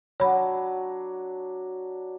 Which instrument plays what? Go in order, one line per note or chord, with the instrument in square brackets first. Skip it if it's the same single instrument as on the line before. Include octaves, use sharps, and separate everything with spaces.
[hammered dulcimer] F#3 D4 [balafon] C#5 B5